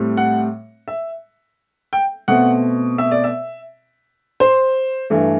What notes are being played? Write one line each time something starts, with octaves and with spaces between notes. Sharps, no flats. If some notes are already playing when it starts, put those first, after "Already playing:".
Already playing: A2 G3 C4
F#5
E5
G5
B2 A3 C4 F#5
E5
D5
E5
C5
G2 E3 A3